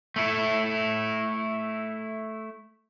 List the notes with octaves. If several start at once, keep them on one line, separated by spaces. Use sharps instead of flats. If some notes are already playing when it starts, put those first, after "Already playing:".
A3 E4